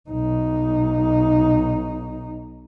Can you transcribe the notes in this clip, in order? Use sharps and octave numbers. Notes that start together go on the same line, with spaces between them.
B1 D#4